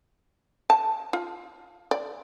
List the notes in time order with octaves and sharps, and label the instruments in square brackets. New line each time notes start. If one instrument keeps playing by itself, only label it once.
[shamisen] A5
F4
D5